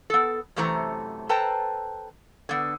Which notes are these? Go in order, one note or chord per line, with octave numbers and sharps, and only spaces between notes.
B3 A4
F#2 C3 E3 A3 C5 A#5
A4 B4 C5 G5 A5 A#5
D3 B3